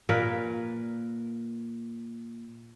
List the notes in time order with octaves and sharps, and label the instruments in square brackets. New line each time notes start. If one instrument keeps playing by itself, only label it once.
[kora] A#2 A#4 B4